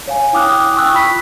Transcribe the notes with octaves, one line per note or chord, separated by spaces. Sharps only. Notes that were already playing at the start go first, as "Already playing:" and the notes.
C#5 F5 G#5
E4 G5 D6 D#6 F6 F#6
G5 C#6 D#6 E6 F#6
F4 B5 B6